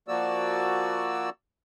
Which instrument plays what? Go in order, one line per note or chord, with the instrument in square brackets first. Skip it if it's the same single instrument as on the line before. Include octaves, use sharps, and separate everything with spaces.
[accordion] F3 A#3 F#4 D5 E6